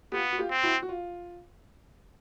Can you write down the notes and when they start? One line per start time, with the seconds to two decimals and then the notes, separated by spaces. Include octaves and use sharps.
0.12 B3 F4 G4
0.32 F#4
0.38 F4 G4
0.51 C4
0.63 E4 F#4
0.82 F#4
0.89 F4